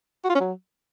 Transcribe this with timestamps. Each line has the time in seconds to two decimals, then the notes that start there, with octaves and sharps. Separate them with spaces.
0.24 F#4
0.30 F4
0.35 C#4
0.40 F#3